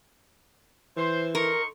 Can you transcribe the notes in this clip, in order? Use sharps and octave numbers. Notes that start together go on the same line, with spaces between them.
E3 C5
D#4 A#4 C6 C#6